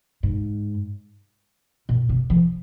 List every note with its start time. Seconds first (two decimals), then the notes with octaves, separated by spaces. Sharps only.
0.23 G#2
1.89 A#2
2.09 C3
2.30 F3